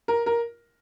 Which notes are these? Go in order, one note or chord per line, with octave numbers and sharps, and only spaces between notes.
A#4
A#4